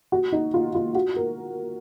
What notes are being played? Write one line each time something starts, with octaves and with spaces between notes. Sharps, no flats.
F#4
D#4
F4
F4
F#4
A#4